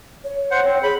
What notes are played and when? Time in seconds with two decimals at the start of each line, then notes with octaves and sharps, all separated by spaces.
0.24 C#5
0.51 C5 F#5
0.65 C4
0.83 G#4 B5